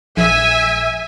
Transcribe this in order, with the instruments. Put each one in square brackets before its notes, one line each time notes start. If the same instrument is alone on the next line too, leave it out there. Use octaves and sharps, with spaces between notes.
[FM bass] A#1 [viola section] E5 G#5